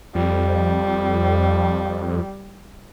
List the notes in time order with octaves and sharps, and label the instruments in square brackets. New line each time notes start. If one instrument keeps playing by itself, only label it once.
[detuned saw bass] F2 [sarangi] G3